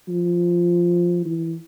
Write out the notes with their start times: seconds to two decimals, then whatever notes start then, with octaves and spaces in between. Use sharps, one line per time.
0.08 F3
1.25 E3